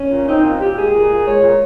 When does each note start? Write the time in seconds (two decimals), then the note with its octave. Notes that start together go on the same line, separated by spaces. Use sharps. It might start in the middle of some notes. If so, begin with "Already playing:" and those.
Already playing: C#4
0.10 A#2
0.26 C4 D#4
0.43 A#2 F4
0.59 A#2 G4
0.76 G#3 G#4
0.92 A#2
1.09 A#2
1.25 G#3 C#5
1.42 A#2